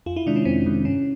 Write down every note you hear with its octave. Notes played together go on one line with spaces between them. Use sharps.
F2 F4
E4
C3 D#3 G#3 D4
C#4
F2 C4
C3 D#3 G#3
G2 C#4